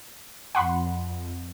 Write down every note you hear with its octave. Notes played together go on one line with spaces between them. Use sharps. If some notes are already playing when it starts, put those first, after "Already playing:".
F2 F#5 B5 C6